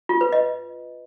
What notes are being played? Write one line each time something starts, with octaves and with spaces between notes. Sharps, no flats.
F4
B4
D#5